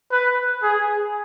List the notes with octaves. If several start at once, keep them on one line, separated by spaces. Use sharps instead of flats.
B4
G#4